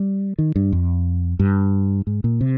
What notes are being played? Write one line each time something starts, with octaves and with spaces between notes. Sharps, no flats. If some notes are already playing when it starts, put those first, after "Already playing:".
Already playing: G3
D#3
G2
F2
G2
G#2
A#2
C3